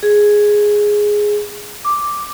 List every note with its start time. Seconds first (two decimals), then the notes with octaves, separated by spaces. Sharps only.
0.03 G#4
1.85 D6